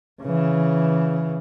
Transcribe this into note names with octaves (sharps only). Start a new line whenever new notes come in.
C#3 E3